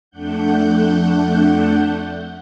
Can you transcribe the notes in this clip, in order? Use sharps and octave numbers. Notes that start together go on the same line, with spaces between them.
F2 A3 D4 F#5 G6